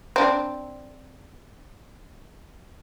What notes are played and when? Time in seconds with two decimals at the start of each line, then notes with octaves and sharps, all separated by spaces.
0.16 C4 D4